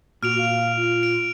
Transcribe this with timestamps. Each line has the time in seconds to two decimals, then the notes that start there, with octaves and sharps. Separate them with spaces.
0.23 A#2 F#4 F6 D7 F7
0.38 F5
0.76 F4
1.03 D7